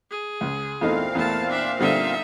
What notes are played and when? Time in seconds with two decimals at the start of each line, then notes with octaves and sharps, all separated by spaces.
0.10 G#4
0.41 C#2
0.81 E2 A#2 A3 C4 D#4 F5
1.15 E2 A3 A5
1.49 D4 E5
1.79 D3 G3 B3 D#4 E5